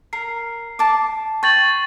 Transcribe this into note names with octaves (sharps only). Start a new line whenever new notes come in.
A#4 C7
A5 D6
G5 C#6 A6 F#7